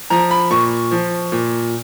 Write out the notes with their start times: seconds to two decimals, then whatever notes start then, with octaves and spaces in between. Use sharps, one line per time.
0.10 F3 A#5
0.31 B5
0.50 A#2 C#6
0.91 F3
1.32 A#2